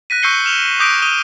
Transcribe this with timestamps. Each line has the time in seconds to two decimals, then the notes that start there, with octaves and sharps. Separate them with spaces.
0.10 F#6 A#6 B6 D#7
0.23 C#6 E6 G6 C7 C#7 G7
0.44 F6 E7 F7 G7
0.80 D6 D#6 G6 A#6 B6 D7
1.02 D#6 D#7 G7